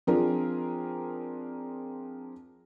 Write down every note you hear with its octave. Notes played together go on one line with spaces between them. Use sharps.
F3 C4 D4 F4 G#4 A#4